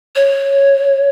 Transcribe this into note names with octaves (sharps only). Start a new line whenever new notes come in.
C#5